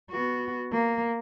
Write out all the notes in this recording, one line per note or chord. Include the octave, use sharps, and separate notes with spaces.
B3 F#4
A#3